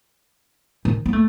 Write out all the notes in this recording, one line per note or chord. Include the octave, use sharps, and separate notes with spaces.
D#3
C4
A3